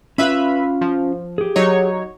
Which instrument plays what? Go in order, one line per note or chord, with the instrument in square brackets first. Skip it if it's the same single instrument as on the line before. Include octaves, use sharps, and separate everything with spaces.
[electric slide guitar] C#4 F4 F5 [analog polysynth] B4 E5 B5
[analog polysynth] F3
[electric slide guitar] G4 G#4
[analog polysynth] F#3 D#4 C#5